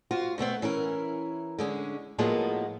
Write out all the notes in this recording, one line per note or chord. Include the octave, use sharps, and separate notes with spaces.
F4 F#4 C5
B2 A3 B3 C4
E3 C#4 E4 A#4
D3 G#3 C#4
A2 F3 F#3 G#3 A#3 B3